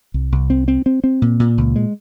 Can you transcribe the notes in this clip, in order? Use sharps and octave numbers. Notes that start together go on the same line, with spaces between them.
C2
C2
C4
C4
C4
C4
A#2
A#2
C#2
G#3